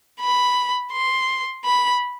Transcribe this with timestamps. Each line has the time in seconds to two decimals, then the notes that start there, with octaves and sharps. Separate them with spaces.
0.21 B5
0.93 C6
1.65 B5